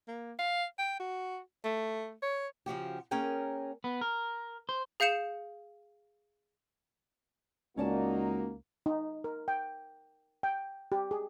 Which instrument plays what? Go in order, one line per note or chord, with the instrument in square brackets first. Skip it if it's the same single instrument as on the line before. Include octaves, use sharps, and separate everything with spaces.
[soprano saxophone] A#3
F5
G5
F#4
A3
C#5
[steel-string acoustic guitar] C#3 F3 F#4 G4
A#3 C#4 G#4 A#4 G5
[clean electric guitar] B3
A#4
C5
[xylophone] G#4 F5 G6 C#7 E7
[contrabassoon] C#2 [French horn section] A#3 D#4 F#4 [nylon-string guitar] C#4 D5 A5
[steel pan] D#4
A#4
G5
G5
G4
G#4